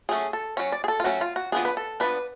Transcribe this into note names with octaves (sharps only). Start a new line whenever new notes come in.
F#3 A3 C#4 G#4
A4
F#3 A3 C#4 C#5
D5
G#4
A4
F4
F#3 A3 C#4 F#4
F4
F#4
F3 B3 D4 G#4
B4
A4
F3 B3 D4 B4